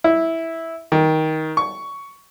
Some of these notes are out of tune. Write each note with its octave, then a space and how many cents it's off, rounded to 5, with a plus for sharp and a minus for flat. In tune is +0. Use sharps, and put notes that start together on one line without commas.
E4 -5
D#3 +15
C#6 +10